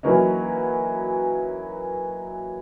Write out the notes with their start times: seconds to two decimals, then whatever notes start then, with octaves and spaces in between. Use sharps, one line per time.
0.03 E3 F#3 A#3 C#4 D#4